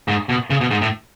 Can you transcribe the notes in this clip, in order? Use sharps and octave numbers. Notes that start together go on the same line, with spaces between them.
G#2
B2
C#3
B2
G#2
A2